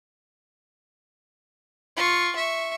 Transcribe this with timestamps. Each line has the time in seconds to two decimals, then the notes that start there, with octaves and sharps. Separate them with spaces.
1.96 F4 C#6
2.36 E5 C#6